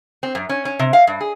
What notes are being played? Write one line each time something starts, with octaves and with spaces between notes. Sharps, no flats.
C4
F#2
C#4
C#4
C3
F5
G2
G#4